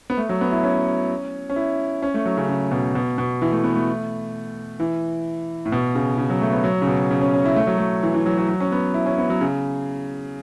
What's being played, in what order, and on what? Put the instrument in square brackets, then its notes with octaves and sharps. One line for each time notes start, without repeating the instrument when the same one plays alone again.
[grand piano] B3
A3
F#3
B3
E4
C#4
C#4
E4
C#4
A3
F#3
C#3
C#3
B2
B2
B2
E3
A3
B3
A3
E3
A2
B2
C#3
C#3
F#3
A3
B3
F#3
C#3
B2
C#3
C#4
C#4
E4
A3
F#3
A3
E3
E3
F#3
F#3
F#3
C#4
B3
E4
C#4
B3
F#3
C#3